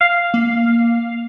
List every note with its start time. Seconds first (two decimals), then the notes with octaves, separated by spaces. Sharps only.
0.01 F5
0.34 A#3